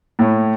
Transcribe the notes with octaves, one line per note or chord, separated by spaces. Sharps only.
A2